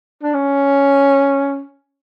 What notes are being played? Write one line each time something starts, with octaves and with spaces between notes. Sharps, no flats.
D4
C#4